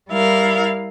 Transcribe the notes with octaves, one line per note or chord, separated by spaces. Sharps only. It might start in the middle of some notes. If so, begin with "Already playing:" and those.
G3 E4 A#4 F5